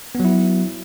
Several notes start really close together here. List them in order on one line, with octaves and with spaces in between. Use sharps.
B3 F#3 E4